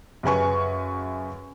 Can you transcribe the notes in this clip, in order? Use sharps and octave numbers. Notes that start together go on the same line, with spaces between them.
F#2 C#3 B4 G#5 C#6